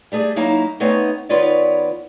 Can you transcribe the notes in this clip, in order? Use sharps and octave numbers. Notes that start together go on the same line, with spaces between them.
G3 A3 G#4 D5
F#3 A#3 D#4 E4 F5 A#5
A3 B3 C4 D#4 C#5 F#5
D#3 B3 F4 B4 C#5 D5